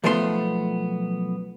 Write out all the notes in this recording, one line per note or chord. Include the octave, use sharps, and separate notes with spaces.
B1 F3 A3 B3 B4 C6